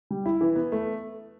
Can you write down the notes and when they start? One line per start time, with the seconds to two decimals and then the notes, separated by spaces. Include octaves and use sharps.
0.11 G3
0.26 E4
0.41 E3
0.56 B3
0.72 A3